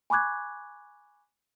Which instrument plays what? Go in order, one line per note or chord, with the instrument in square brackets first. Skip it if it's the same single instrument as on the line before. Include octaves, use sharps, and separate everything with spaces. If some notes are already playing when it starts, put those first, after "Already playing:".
[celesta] G#5 B5 C#6 D6 F#6 G#6